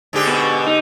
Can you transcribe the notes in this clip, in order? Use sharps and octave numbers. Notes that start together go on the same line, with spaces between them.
G#2 D3 G4
B2
D#4